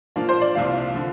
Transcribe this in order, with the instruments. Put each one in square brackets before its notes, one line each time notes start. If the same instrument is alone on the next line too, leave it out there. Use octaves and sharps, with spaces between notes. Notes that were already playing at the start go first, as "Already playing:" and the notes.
[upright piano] A#2 F3 A#3 D4 F4
[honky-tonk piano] C5
D5
[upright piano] C2 C3 F3 A#3 F4 [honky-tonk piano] F5
[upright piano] D3 F3